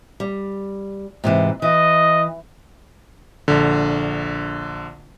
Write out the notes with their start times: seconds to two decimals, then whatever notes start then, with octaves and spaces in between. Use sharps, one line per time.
0.20 G3
1.24 G#2 C3 E3
1.62 E3 D#5
3.48 A#1 D3